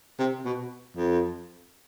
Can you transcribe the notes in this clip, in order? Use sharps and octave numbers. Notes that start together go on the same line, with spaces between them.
C3
B2
F2